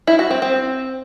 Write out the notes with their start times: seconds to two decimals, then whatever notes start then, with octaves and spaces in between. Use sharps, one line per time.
0.07 E4
0.19 F#4
0.30 C4
0.42 C4